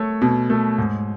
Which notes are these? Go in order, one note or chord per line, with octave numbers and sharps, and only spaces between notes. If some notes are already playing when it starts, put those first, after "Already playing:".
Already playing: A3 C#5
B2
A3
G#2